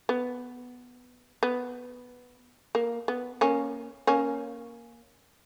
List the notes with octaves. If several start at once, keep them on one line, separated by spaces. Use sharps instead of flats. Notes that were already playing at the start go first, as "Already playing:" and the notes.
B3
B3
A#3
B3
A#3 C#4
A#3 C#4